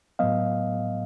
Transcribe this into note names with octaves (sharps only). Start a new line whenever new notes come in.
A2 F#3 B3 D#5 F5